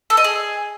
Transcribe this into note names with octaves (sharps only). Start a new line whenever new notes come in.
A4
D#5
G#4